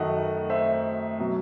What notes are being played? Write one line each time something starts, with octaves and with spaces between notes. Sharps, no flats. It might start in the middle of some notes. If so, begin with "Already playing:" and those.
Already playing: F#2 D#3 A3 D#5 F#5
C5 E5
B2 F#3